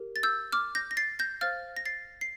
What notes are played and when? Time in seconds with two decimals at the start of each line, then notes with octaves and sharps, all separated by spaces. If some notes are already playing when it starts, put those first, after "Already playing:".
Already playing: G4 A#4
0.16 A6
0.23 E6 G6
0.52 D6 F6
0.75 G6 A#6
0.91 A#6
0.97 A6 C7
1.19 G6 A#6
1.41 C5 F5 F6 A6
1.77 A#6
1.85 A6 C7
2.21 C7